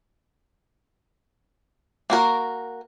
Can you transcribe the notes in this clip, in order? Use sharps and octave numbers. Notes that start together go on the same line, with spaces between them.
A#3 F#4 A#4